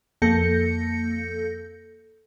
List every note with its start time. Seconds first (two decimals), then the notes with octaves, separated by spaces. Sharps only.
0.22 F2 A#3 A4 G6 A#6 C#7